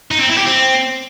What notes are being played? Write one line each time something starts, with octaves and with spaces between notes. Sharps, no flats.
D#4
C4
E4
G4
C4